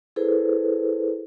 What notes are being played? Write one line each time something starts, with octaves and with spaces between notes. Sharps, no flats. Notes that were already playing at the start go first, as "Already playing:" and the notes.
E4 G#4 A4 B4 C5